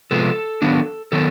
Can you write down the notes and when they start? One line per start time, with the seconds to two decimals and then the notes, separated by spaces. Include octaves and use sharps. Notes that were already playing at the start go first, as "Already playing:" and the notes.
0.11 C3 F3 G#3 B3 A4
0.62 D#3 F#3 B3 D4
1.12 D#3 F#3 B3 A4